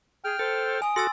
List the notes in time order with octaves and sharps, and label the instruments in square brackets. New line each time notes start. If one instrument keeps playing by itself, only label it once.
[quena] G#4 [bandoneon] G5 F6
[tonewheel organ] A4 [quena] C5
[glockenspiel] G#5 [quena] D#6
[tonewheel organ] F#4 A4 [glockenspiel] C6 E6 A6